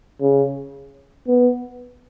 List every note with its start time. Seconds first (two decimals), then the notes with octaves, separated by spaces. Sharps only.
0.21 C#3
1.28 B3